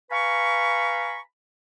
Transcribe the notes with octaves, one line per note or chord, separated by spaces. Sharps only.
B4 F5 G#5 A#5 B5 C#6